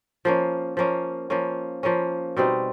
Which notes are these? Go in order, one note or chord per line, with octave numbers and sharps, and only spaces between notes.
F3 A#3 C#4
F3 A#3 C#4
F3 A#3 C#4
F3 A#3 C#4
B2 G3 C4 D#4